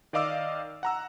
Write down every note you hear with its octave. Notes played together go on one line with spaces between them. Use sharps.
D#3 D5 D#5 F5 D6 E6
F#5 A#5 E6